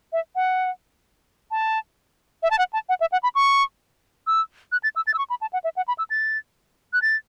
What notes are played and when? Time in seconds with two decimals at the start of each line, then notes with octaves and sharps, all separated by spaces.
0.13 E5
0.35 F#5
1.51 A5
2.43 E5
2.51 A5
2.59 F#5
2.73 A5
2.89 F#5
3.00 E5
3.12 F#5
3.23 B5
3.35 C#6
4.27 E6
4.72 F#6
4.83 A6
4.96 E6
5.07 A6
5.14 E6
5.18 C#6
5.30 B5
5.41 A5
5.53 F#5
5.64 E5
5.76 F#5
5.88 B5
5.98 E6
6.10 A6
6.93 F#6
7.02 A6